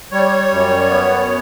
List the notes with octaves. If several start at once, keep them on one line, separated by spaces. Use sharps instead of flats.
G3 C#5
F#2
B3